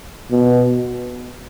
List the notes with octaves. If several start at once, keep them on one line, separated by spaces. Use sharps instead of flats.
B2